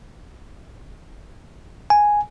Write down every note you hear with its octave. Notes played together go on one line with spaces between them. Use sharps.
G#5